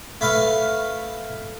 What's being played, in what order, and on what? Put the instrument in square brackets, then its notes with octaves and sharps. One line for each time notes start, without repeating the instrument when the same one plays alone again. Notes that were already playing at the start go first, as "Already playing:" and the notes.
[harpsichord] A3 B4 F5